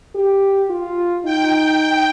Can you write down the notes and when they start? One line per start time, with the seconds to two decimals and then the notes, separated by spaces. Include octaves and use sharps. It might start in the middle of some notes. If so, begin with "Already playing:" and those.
0.15 G4
0.70 F4
1.25 D#4 G5
1.79 G5